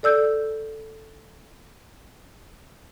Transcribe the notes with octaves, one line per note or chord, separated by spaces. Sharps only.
A4 D5 E6 G6